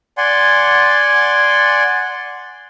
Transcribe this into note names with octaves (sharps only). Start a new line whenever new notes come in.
D5 F#5 G#5 C6